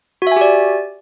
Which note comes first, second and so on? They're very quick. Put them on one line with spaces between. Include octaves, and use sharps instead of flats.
F#4 E5 G#5 G4 D5